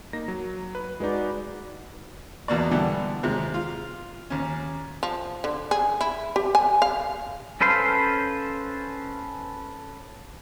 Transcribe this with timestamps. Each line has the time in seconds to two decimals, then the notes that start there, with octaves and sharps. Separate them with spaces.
0.13 A#3 D#4 A#6
0.28 F#3
0.75 B4
1.00 G#3 D#4 F#4 B4 D5
2.48 E2 B2 A#3 D5
2.71 D3 E3 G3 B3
3.23 D#2 C3 G#3
3.54 F4
4.30 D#2 C#4
5.03 F3
5.44 D3
5.71 G#4
6.01 E4
6.36 G4
6.55 G#5
6.82 F5
7.61 C#4 A4 B4 C5 F5